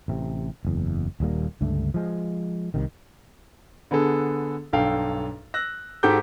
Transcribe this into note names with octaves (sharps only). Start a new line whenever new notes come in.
A1 C3
F#1 E2
D#1 D#2 G3 A#3
C#2 G2 D3 A3
F3 G#3
C2 C3 D#3
D3 B3 G#4 A4
B1 G2 A4 F5 G5
E6 F#6 A#6
G#2 F#4 G4 A4 D6 G6